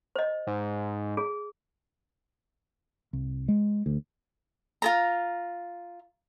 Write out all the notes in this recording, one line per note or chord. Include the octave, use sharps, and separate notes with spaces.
C5 D#5
G#2
G#4
C2
G#3
D2
F4 A4 A#5